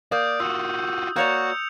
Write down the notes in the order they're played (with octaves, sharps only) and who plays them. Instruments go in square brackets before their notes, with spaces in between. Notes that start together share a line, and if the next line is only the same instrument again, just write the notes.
[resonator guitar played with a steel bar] A#3 [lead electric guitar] D5 [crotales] D#6 G6
[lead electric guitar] F4 F#4 [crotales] E6
[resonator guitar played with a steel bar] A#3 C#5 D5 [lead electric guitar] F#4 [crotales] G6 C#7 F7